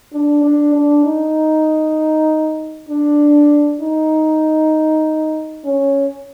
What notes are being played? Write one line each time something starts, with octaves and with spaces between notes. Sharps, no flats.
D4
D4
D4
D#4
D4
D#4
C#4